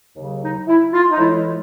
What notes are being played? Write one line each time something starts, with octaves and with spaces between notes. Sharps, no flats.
D#2 C#3 F#3
D#4
E4
F4
D#4
A2 E3 G#3 E4